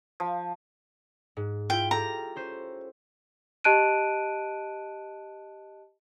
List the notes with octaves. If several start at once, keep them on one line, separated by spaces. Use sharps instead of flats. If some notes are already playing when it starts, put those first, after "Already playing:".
F3
G#2
E4 F4 G5
G4 A4 A#5
C#4 C5 E7
G4 D#5 A5 F#6 D7 D#7